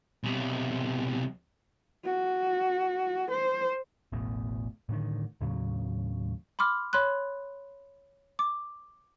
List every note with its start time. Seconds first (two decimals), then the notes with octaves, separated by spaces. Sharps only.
0.24 B1 C3
2.05 F#4
3.31 C5
4.12 E1 A1 E2 A2
4.89 A2 D3 D#3
5.41 D#2 A2 C#3 F#3
6.59 B5 C6 D6 F6
6.93 C#5 B5 C6 F#6
8.39 D6